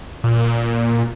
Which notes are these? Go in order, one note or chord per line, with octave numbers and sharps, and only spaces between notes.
A#2